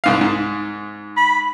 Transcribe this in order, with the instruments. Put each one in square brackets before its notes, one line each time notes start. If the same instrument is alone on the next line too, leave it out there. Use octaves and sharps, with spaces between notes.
[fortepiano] C2 G#2 F5
G#2
[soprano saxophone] B5